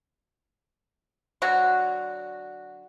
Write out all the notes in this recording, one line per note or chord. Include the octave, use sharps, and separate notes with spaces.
D3 F#3 F#4